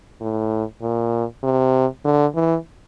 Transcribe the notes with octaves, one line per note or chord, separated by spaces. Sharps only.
A2
A#2
C3
D3
E3